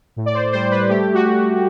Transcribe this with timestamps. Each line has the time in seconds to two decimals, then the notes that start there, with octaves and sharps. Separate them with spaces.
0.16 A2
0.26 D5
0.34 C5
0.52 G3 C5
0.71 B4
0.89 A3 G4
1.14 F#4